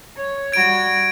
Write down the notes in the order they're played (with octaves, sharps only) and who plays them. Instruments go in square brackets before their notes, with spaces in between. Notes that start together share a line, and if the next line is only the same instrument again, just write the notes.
[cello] C#5
[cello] G3 F#4 [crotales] G#6 D7